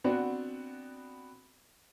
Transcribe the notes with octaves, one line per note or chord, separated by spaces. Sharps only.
B3 C4 D4 F#4